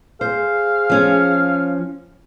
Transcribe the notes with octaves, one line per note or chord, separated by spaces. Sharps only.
G#4 C5 F5
F3 C#4